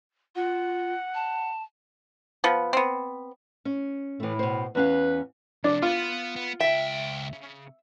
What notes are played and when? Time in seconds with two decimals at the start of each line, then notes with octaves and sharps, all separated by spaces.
0.35 F4 F#5
1.15 A5
2.44 F3 B3
2.73 B3 C4
3.65 C#4
4.20 A2 E3 A3
4.39 B2 C5
4.75 E2 C#4 B4 F5
5.64 F2 C3 D4
5.82 B3 F4
6.36 B3
6.61 C#2 E5 G5
7.33 C#3